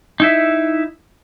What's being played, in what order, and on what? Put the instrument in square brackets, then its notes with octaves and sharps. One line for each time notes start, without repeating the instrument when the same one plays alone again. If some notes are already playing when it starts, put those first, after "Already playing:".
[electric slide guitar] D#4 E4 E5